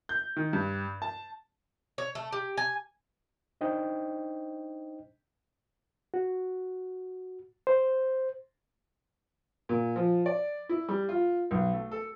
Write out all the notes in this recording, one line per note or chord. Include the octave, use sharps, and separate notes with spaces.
G6
D#3
G2
A5
C#5
A3
G4
G#5
D4 D#4 C5 D#5 G5
F#4
C5
A#2
F3
D5
E4
G3
F4
B1
A3
A4